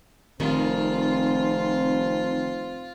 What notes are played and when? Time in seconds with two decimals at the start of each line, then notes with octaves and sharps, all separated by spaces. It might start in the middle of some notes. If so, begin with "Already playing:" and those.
0.40 F1 D#3 G3 C4 F4